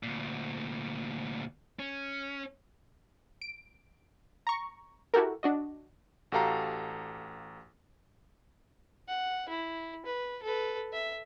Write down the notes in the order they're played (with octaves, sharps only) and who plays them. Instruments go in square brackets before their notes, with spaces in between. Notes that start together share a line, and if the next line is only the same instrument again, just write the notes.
[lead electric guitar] D2 A#2
C#4
[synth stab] D7
A#5 C#6
E4 F#4 G4 A4 A#4
D4 F#4 D#5
[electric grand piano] A1 F#4 G4 A4 F5 A#5
[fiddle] F#5
E4
B4
A4 B4
E5